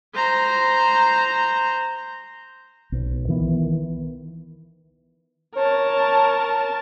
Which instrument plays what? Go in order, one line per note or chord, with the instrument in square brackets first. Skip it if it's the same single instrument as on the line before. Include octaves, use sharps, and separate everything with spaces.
[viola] C5 A#5
[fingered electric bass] B1
D#3 E3 B3
[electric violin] A#4 A5 [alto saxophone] C#5